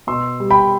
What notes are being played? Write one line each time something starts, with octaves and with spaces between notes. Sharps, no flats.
B2 C6 E6
G3
G5 B5